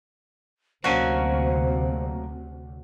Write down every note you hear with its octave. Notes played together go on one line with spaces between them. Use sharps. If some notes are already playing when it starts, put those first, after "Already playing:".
D2 C3 F#3 A#3 C#4 D4 F#4 C5